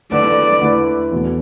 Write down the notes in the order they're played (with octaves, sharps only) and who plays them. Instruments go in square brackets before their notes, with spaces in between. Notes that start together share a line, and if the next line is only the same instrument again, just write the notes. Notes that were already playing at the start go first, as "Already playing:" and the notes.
[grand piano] D3 A3 E4 B4 [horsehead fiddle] D5
[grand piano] D3 A3 E4 B4
E2 B2 A3